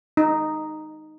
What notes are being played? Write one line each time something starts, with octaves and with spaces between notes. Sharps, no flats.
D#4